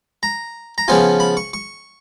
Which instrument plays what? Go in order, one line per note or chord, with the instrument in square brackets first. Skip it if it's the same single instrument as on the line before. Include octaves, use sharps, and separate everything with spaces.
[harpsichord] A#5
A#5
C#3 F3 B3 F4 G#5
B5
C#6
C#6